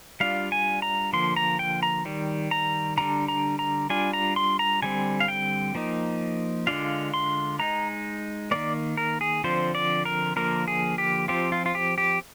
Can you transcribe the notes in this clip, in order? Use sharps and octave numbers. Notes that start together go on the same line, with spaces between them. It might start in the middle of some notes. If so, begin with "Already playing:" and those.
G3 D4 F4 F5
G#5
A#5
D3 F3 A#3 C6
A#5
G5
A#5
D#3 G3
A#5
D3 G3 D4 A#5
A#5
A#5
G3 D4 F4 G#5
A#5
C6
A#5
D3 G3 C4 G#5
F5
G5
F3 A#3 D#4
D3 G#3 D4 F4 F5
C6
G#3 D#4 A#5
D#3 G3 A#3 D5
A#4
G#4
D3 F3 C4 F4 C5
D5
A#4
D3 F3 A#3 A#4
G#4
G4
F3 C4 F4 G4
F4
F4
G4
G4